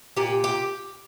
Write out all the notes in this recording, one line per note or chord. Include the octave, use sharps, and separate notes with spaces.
A#2 G4
G4